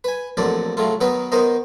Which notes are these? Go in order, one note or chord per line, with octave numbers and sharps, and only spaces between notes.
B4 G#5
A1 F2 A#2 D3 F#3 D5
A2 C#3 F#3 A3 F4
D#3 F#3 B3 D#4 A#4 B4
D#3 B3 D#4 A#4 C5 D#5